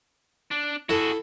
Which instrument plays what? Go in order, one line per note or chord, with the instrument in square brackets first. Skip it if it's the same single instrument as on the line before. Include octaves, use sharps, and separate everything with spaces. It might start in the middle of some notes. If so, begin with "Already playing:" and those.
[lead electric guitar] D4
[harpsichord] E4 A4 [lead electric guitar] F#4 G#4